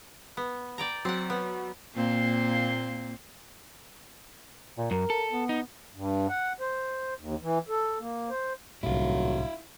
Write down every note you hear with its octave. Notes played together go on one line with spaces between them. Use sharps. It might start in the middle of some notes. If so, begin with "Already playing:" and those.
B3
D5 G5 A#5
F#3 C4 F#5
B3
A#2 A#3 C4
A#2
F#2 A#4
A4
B3
D#4
G2
F#5
C5
D#2
E3
A4
A#3
C5
D#1 C2 A2 F#3 E4 F5